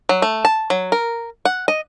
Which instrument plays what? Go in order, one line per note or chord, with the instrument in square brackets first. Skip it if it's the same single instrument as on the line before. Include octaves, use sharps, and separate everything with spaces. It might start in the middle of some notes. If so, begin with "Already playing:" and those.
[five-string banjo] F#3
A3
A5
F#3
A#4
F#5
D#5